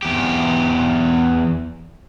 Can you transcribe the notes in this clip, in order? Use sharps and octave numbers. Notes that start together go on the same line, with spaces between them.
E2 G4